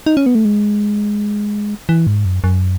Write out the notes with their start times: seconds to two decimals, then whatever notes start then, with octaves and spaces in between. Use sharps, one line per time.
0.06 D#4
0.17 C#4
0.26 B3
0.35 A3
0.45 G#3
1.89 E3
2.07 G#2
2.25 F#2
2.44 F#2